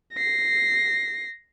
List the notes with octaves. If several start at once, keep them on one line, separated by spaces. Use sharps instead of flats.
A#6 C7